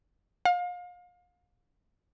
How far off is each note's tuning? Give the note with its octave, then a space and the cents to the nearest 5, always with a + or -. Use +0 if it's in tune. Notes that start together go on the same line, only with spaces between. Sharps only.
F5 +35